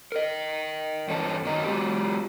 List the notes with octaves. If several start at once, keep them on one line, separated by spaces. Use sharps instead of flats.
A#4 D#5
E2 G2 C#4 A4
F#2 D#3 F#3 D#5 A#5
F#3 G#3 F4 G4